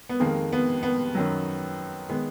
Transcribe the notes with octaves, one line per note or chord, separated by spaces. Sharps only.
B3
F2 D#3 G#3 A#3
B3
B3
F#2 D#3 F#3
D#3 G#3 B3